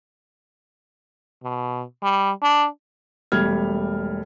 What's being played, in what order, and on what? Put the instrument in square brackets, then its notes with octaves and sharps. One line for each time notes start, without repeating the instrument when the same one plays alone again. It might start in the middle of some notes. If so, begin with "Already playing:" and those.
[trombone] B2
G3
D4
[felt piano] E1 G3 A3 F6 G#6